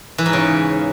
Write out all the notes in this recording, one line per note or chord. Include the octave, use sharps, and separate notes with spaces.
E3
G#2
C#3